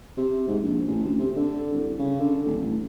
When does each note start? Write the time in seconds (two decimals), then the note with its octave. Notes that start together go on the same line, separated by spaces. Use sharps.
0.17 C3
0.48 G#2
0.63 A#1
0.88 A1
1.03 D2
1.19 C3
1.36 D3
1.73 C2
1.99 C#3
2.20 D3
2.46 D#1
2.61 A1